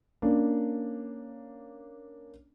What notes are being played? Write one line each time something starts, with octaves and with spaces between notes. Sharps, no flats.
A#3 C#4 D4